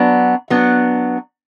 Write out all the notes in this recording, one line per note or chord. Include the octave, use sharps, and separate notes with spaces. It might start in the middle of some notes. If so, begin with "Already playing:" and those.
Already playing: F#3 B3 D4
F#3 B3 D4